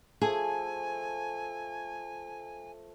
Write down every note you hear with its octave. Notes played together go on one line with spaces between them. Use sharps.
F3 A3 G#4 G#5